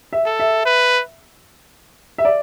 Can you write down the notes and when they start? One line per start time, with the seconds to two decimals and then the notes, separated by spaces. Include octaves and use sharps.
0.13 E5
0.26 A4
0.40 E5
0.66 B4
2.18 E5
2.25 D5